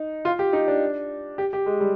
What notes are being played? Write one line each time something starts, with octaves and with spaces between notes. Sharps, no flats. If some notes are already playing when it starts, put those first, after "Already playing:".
Already playing: D#4
F4
G4
D#4
D4
G4
G4
G#3
G3